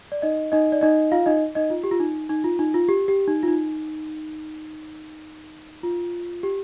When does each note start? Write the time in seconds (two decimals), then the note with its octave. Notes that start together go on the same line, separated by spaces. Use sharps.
0.12 D5
0.22 D#4 D#5
0.52 D#4 D#5
0.72 D5
0.81 D#4 D#5
1.12 F4 F5
1.26 D#4 D#5
1.55 D#4 D#5
1.70 F4
1.83 G4
1.91 F4
2.00 D#4
2.30 D#4
2.44 F4
2.59 D#4
2.74 F4
2.88 G4
3.08 G4
3.28 D#4
3.43 F4
3.47 D#4
5.83 F4
6.43 G4